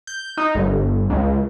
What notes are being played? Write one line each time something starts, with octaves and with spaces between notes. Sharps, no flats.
G6
D#4
G1
C#2